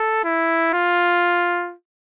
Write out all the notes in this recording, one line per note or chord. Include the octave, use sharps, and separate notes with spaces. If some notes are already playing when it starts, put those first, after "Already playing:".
Already playing: A4
E4
F4